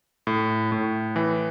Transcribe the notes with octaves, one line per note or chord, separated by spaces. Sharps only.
A2
A2
E3